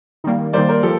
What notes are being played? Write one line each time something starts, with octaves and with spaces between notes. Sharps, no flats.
D#3 G3 A#3
D#3 G3 A#3 C5 D5
A#4 C5
F3 G4 A4